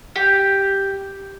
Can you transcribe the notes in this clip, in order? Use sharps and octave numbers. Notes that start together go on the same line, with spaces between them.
G4